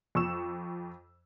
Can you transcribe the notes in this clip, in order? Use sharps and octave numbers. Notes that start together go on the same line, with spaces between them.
F2 C#6 E6 E7